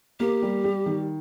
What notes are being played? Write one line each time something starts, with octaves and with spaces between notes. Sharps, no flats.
A#3 G4
G3
G3
D#3